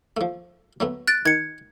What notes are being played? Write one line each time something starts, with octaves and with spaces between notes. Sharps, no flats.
F3 A3
F#3 A3 B3
F#6 A6 D7
D#3 G#6 C#7